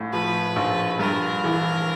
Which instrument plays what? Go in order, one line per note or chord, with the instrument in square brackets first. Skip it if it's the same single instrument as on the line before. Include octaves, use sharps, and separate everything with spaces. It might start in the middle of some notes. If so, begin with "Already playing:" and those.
Already playing: [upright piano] A#1 A2
[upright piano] F3 [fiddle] B4
[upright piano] A#1
[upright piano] G2 [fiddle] A#4
[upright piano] E3